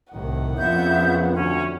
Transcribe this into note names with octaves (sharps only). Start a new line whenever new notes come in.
C2 A2 D#3 F#5
F2 C#3 A#3 B3 E5 G6
D2 C#4 C#5